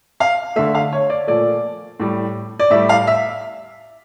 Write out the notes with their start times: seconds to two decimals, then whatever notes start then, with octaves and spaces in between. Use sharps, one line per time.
0.20 F5
0.56 D3 A3 E5
0.75 F5
0.93 C#5
1.10 D5
1.27 A#2 F3 A3 D5
2.00 A2 G3
2.59 D5
2.70 A2 E5
2.74 G3
2.89 F5
3.07 E5